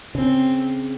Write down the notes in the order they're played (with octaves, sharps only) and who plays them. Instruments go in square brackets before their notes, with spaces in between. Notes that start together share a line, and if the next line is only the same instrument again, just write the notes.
[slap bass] C#3 [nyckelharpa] C4